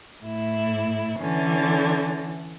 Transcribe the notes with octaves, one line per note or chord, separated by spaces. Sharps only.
A2 E4
D3 E3 C#4